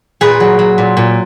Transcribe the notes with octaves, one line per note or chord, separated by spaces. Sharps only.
A#2 G#4 B4
F#3
F#3
A#2
A#2